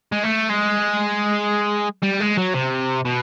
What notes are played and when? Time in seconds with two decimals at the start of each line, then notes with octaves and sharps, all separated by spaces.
0.12 G#3
0.23 A3
0.49 G#3
2.02 G3
2.20 G#3
2.37 F#3
2.54 C3
3.06 B2